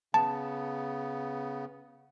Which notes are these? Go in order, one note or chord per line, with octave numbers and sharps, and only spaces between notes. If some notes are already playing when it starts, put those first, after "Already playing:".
C#3 B3 A5